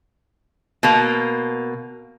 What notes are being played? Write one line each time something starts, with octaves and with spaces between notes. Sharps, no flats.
B2 A#3